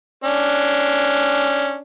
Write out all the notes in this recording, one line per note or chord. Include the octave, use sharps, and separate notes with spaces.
C#4 D4